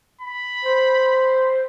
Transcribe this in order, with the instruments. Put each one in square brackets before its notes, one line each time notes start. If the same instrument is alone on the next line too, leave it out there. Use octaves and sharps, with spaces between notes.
[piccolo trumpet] B5
[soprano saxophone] C5